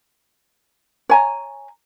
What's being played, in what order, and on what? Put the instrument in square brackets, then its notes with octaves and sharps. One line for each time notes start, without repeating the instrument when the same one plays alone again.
[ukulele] C#5 G#5 A#5